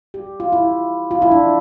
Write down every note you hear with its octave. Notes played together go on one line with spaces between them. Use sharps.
G4
F4
E4
F4
E4
D4